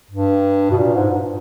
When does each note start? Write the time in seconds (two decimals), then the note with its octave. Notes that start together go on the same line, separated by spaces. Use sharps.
0.11 G2
0.71 B2
0.78 A#2
0.95 G#2
1.12 G2